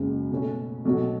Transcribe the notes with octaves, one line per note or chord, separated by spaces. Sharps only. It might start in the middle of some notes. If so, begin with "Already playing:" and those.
Already playing: F#1 F#2 C#3 G#3
B2 A3 C#4
B1 B2 F#3 A3